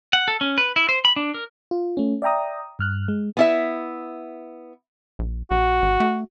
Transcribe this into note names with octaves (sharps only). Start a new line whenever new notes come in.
F#5
A4
C#4
B4
E4
C5
B5
D4
A#4
F4
A3 C#4
D5 E5 G5 A#5 D#6
G2 F6 F#6
G#3
B3 E4 E5
A#1
A#1 F#4
G#1
A3